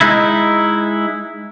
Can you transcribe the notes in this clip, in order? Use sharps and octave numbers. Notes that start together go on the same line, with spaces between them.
G#3 D#4 E4